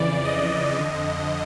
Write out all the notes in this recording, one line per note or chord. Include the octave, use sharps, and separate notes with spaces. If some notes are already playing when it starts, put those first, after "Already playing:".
Already playing: F2 C#3 E3 D5
D#5
F2 D3